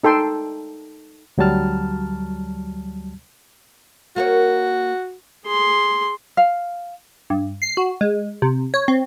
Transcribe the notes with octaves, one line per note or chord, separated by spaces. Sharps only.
D#4 A4 G5 C6
D2 F#3 G3 A5 F6
A#3 F#4 A#4 C#5
G#4 C6
F5
G2
C7
F#4
G#3
C3
C#5
C4